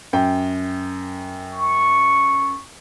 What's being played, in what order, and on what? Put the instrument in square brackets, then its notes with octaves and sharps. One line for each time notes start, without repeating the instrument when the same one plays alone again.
[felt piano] F#2 G5
[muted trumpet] C#6